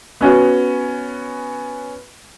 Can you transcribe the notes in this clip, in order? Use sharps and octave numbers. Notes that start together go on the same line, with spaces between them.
B3 C#4 F#4